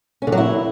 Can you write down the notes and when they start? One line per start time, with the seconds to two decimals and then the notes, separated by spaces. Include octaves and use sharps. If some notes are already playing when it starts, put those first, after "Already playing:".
0.22 C#4
0.27 D3
0.32 F#3
0.38 E4